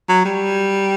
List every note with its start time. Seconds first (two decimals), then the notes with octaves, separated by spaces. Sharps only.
0.09 F#3
0.25 G3